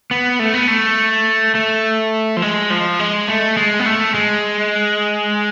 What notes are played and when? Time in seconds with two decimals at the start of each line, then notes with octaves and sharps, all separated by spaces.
0.11 B3
0.39 A3
0.54 B3
0.68 A3
1.55 A3
2.37 F3
2.42 G#3
2.70 F3
2.99 G#3
3.28 A3
3.57 G#3
3.79 B3
3.86 A3
4.14 G#3